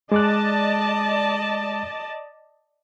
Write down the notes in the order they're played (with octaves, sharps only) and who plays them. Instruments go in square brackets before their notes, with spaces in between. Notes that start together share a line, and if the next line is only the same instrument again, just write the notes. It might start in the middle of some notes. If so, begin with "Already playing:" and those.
[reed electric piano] G#3 D6 F#6 [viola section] D5 D#5 A5